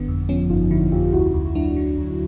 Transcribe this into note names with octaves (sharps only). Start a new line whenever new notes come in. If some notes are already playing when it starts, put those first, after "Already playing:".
Already playing: G1 D3 B3
F2
F3 B3 C#4
G1 D#4 F4
D3 E4 F#4
F2 F4 G4
D2 E4 F#4
D2
F#3 D4 E4
D3
D2